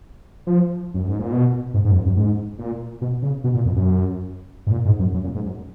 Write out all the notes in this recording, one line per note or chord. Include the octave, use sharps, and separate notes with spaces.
F3
F#2
G#2
A#2
B2
G#2
G#2
F#2
F2
F#2
G#2
A#2
B2
C#3
B2
A#2
F2
F#2
G#2
A#2
G#2
F#2
F#2
A#2
G#2
F#2